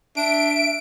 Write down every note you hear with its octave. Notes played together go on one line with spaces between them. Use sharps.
D4 E5 D7